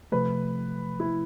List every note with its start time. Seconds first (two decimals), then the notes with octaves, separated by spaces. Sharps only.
0.12 C3 F3 A3 B4
1.00 E4